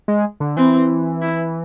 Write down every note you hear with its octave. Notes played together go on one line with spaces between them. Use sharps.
G#3
D3
E3 C4
E4